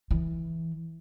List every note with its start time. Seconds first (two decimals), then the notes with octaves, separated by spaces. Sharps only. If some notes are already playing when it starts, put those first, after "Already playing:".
0.11 E3